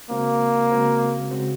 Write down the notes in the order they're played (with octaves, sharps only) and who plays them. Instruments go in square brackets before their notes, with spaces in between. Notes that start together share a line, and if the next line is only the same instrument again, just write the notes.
[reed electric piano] C#3 G#3 C4 F#4 C5 [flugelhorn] A#3
[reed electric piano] C#3 G#3 C4 F#4 C5
C#3 G#3 C4 F#4 C5